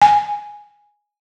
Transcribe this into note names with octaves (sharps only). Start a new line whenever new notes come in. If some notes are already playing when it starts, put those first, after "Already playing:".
G#5